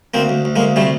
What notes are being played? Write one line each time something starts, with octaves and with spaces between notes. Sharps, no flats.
D2 A#3 C4
D2
D2
G#3 A#3
D2
C3 G3 A3